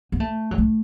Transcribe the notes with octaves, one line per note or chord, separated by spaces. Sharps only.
B3
A3
F#3
A3